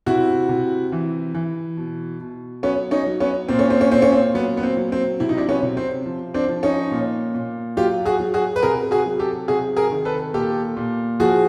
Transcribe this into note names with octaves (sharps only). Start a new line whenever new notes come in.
C3 E4 F#4
C3
E3
E3
B2
B2
F#3 B3 C#4
C#4 D#4
F#3
B3 C#4
A#2 C4
C#4
C4
C#4
A#2 C4
C#4
C4
F#3 B3
B3
C4
F#3
C4
C3 E4
D#4
D4 E4
B3 C#4
C3
C4
F3
C4 D4
F3
C#4 D#4
A#2
A#2
F#3 F4 G4
F#4 G#4
F#3
F#4 G#4
B4
C3 G#4 A#4
F#4 G#4
F#3
G4 A4
C3 F#4 G#4
G#4 A#4
D#3
A4 B4
A#2 G4 A4
A#2
F3 F#4 G#4